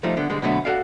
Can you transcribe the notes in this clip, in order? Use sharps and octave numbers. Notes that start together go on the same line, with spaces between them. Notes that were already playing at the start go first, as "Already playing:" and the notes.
F3 G3 A3 D#4 F4
D3 B3
D3 G3 G#3
B2 D3 F#3 A3 B3 D4
F#4 A4 D5 F5